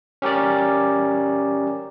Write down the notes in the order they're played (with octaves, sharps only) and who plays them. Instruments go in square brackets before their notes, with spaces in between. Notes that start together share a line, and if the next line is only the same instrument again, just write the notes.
[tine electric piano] C#4 G4 A#4 D5